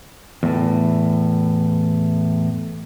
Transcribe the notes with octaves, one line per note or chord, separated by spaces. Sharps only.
E2 A2